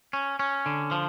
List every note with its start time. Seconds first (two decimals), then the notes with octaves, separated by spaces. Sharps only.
0.13 C#4
0.39 C#4
0.66 D3
0.91 F3